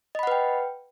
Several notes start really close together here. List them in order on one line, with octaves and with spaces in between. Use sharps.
D#5 B5 F#5 B4 G5